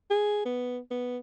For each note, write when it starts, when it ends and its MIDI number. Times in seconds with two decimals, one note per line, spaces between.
0.11 0.45 68
0.45 0.80 59
0.91 1.18 59